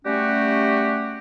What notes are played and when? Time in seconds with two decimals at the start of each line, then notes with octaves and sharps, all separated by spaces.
0.05 G3 A3 C#4 F#4 G4